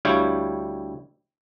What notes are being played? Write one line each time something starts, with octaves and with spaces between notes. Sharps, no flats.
D2 G3 E4 C#5 F5 G5